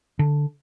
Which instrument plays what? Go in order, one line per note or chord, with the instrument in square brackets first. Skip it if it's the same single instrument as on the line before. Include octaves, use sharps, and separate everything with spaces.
[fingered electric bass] D3